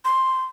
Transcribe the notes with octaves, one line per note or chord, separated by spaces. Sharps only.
C6